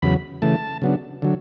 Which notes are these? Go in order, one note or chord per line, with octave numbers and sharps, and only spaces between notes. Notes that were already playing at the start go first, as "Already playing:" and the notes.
E2 C#3 F#3 B5
C#3 E3 A3 A5
C#3 F#3 B3 D4
D3 F#3